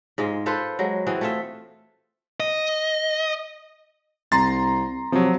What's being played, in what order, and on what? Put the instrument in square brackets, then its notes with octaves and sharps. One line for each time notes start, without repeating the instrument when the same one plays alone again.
[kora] G#2 G#3 F4
F4 A4 B4 C5
F#3 G#3
E3 C4 F#4 G#4
A3 F4 E5
[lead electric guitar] D#5
[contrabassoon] C2 [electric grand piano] A#5 C6 A6
[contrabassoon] C3 [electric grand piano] F3 F#3